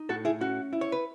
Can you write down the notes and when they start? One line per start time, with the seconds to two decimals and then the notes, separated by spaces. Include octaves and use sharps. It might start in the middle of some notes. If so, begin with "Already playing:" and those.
Already playing: D#4
0.09 A2 F#4 A4
0.25 E4 G#4
0.41 C#4 F#4
0.73 E4
0.81 C#5
0.92 B4